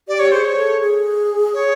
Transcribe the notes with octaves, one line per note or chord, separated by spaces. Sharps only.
G4 D5
C#5
G#4 C5
C#5
A4
G#4
C#5